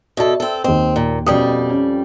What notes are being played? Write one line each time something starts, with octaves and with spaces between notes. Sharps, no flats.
B2 A4 D5 E5
C4 A4
D#2 C4 D#5
A#2
F2 B2 G3 C#4 D5 D#6
C#4